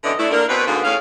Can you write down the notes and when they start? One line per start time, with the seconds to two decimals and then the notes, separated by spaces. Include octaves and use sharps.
0.03 F#2 D3 E3 B3 D5 D#5
0.18 A3 D4 E4
0.31 D3 A#3 D4 A#4
0.49 B2 C4 B4
0.66 G#2 D3 A#3 B3 F#4 G#4
0.84 A2 C#4 G#4 F5